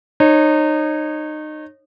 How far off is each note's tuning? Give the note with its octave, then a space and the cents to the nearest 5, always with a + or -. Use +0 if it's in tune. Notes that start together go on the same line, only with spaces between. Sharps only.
D#4 -25 C#5 -30